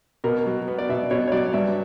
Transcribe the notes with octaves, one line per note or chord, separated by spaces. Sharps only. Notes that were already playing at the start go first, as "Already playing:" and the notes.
B2 A#4
F#3
B3
D5
B2 E5
B2 C#5
C#5
F#3 D5
G2 E5